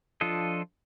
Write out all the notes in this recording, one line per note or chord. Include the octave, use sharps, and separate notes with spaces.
F3 D4 F4 A4 D#5